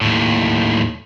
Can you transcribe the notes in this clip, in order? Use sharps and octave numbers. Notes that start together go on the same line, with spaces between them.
D#2 A2